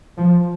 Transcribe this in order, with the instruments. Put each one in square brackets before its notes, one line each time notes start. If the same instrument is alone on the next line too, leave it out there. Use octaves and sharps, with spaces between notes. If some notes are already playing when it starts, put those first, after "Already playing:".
[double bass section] F3